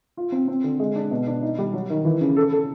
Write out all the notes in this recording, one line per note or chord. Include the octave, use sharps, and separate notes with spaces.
F4
C4
C4
D3
G#3
D4
B2
D4
D#4
G3
F#3
D#3
E3
C#3
A4
A4